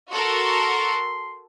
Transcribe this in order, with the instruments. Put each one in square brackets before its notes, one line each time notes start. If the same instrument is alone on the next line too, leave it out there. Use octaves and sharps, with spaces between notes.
[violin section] F#4 A4 A#4 [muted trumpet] C6